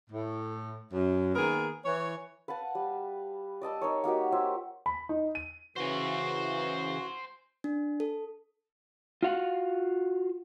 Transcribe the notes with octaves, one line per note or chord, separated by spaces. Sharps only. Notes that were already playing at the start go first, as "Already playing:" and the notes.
A2
F#2
D#3 A#3 B3 G#4 A#4
E3 C#5
B4 F5 F#5 A5
G3
D5 D#5 A5 E6
D#4 A#4 C#5
A#3 D#4 F#4 G4
F4 C5 C#5 E5
B5
D#4
D#7
C#3 E3 F#4 C5 G#5
D4
A4
F4 F#4 F5 F#5